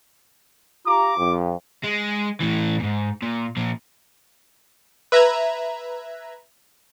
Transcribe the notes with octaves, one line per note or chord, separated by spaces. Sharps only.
F4 G4 A#5 D6
F2
G#3
A2 E3
E2 G#2
A#2
A#2 F3
B4 E5 A#5 E6 F#6 G#6